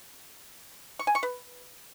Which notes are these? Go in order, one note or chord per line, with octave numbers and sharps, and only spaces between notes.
C#6
G#5
C#6
B4